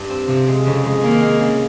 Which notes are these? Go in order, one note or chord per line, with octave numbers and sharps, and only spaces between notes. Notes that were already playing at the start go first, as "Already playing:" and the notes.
Already playing: G2
C4
C3 F3
G#3
F2 C#3
G#3
D#3 A#3
G#3
C#3